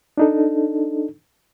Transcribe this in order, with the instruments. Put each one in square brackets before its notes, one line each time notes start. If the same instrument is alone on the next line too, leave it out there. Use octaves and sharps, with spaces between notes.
[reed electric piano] D4 D#4 A4